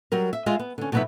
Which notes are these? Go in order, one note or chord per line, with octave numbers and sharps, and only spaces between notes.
F#3 G3 A#4
E5
G#3 F4 D#5 E5
B3
D3 C#4
B2 D3 F#3 B3 D#4 E5